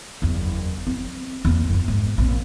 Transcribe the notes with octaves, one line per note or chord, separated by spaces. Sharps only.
F#1 E2
C4
E2 A#3
F#2 F4
G#2
A#1 C4